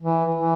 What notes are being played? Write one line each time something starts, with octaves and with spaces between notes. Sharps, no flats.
E3
E3